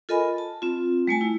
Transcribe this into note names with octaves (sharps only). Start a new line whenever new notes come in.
F4 A4 A#4 D#5 G#5 B5
A5
C4 F4
G3 A3 G#5 A5
E4